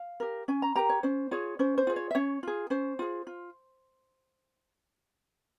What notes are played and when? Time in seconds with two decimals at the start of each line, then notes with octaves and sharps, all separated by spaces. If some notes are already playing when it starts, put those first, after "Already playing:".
Already playing: F5
0.20 G4 A#4
0.48 C#4 G#5
0.62 A#5
0.76 G4 A#4 A#5
0.89 C#5
1.03 C#4 C5
1.31 F4 G#4 C#5
1.59 C#4 C5
1.78 C5
1.87 F4 G#4
1.96 C#5
2.11 E5
2.15 C#4 C#5
2.43 F4 G#4
2.70 C#4 C5
2.99 F4 G#4
3.27 F4